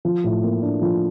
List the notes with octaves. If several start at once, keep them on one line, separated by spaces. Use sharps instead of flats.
F3
A2
A#3
D4
F3